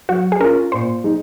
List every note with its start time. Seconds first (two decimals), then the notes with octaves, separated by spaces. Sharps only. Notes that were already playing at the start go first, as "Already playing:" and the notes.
0.09 F#3 F#4
0.32 G#4
0.40 C#4 F4 A#4
0.72 A#2 C5
1.04 G#3 D#4